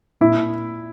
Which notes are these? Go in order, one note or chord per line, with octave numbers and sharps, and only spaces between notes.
A#2 E4